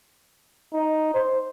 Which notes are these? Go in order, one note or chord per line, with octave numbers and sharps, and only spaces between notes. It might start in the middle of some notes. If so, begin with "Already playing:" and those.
D#4
C5